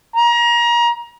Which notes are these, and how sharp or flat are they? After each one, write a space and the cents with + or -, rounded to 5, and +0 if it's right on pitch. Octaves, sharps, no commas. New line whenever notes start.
A#5 +30